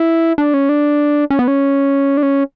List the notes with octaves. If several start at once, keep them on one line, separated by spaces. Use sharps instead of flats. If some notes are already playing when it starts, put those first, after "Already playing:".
Already playing: E4
D4
C#4
D4
C#4
B3
C#4
D4
C#4